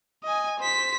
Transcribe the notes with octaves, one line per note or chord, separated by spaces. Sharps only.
D#5 G#5
C5 B6